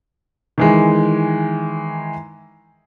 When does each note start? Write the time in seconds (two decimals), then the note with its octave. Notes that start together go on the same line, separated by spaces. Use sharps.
0.58 D#3 E3 G#3